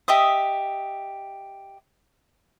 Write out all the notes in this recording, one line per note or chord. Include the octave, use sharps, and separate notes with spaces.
G4 D#5 E5 D#6